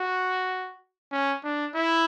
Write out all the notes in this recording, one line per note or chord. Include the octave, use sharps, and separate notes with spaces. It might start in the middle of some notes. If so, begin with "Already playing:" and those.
Already playing: F#4
C#4
D4
E4